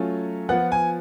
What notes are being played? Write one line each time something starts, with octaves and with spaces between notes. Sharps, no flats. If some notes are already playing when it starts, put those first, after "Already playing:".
Already playing: F#3 A3 C#4 F4
F3 B3 F4 F#5
G#5